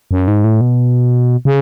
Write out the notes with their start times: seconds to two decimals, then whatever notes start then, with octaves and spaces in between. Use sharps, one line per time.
0.11 F#2
0.28 G#2
0.44 A2
0.61 B2
1.45 C#3